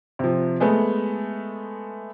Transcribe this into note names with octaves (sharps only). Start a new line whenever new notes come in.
C3 F3
G#3 A3 B3